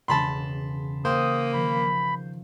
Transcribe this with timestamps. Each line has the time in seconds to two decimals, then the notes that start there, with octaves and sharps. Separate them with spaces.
0.08 E1 C#3 A5 B5 C6 A6
1.05 A#3 C5 F5 G5 D#6
1.54 D#3 F3 B5